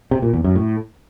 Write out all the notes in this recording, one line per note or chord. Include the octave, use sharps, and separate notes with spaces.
C3
A#2
E2
F#2
A2